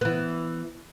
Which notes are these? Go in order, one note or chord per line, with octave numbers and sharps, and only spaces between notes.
E3 B3